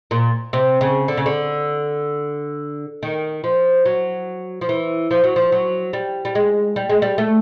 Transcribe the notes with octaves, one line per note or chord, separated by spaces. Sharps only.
A#2
C3
C#3
D3
C#3
D3
D#3
F3
F#3
F3
E3
F3
F#3
F3
F#3
G3
G3
G#3
G3
G#3
G3
A3